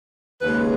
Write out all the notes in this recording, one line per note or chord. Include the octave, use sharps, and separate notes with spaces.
D#2 C#3 G#3 B4